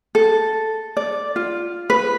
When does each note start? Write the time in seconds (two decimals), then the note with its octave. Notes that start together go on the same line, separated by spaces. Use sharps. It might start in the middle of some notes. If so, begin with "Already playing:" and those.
0.15 A4
0.97 D5
1.36 F4
1.90 B4